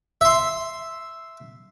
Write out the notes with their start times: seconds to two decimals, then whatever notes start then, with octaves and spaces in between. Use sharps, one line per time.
0.21 E5 C6